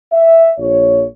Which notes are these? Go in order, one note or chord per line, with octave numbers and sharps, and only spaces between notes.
E5
A#1 C#5